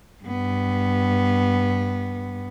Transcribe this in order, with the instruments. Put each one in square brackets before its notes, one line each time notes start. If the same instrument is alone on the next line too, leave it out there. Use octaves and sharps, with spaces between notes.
[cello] G2 B3